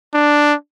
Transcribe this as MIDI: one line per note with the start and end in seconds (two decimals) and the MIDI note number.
0.14 0.54 62